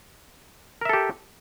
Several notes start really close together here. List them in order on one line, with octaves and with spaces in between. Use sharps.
A#4 E5 A4 G4